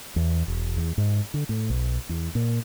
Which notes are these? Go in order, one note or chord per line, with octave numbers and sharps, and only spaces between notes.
E2
E1
E2
G#2
D3
A2
B1
E2
A#2